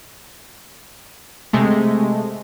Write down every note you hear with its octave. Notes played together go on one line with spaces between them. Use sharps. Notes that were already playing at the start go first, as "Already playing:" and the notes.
C3 G#3 A3